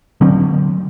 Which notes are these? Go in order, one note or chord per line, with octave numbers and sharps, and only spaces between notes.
D3 F#3 C4